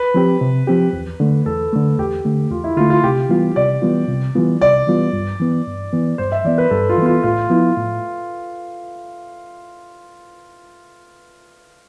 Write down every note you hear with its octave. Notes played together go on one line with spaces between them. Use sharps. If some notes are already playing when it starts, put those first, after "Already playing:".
Already playing: B4
F3 C4 G4
C3
F3 C4 G4
E2
D3 A3
E2 A4
D3 A3
E2 G4
D3 A3
E2 F4
E4
D3 A3 F4
F4
C3 G4
E3 G3 B3 F4
C3 D5
E3 G3 B3 F4
C3
E3 G3 B3 F4
C3 D5
E3 G3 B3 F4
G2
E3 B3
G2
E3 B3
G2 C5
E5
E3 B3 D5
B4
G2 A4
F4
E3
B3 F4
A2 F4
F3 B3 E4
A2